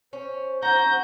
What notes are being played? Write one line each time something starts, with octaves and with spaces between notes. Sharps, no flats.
C#4 C5
F#4 A#5 G6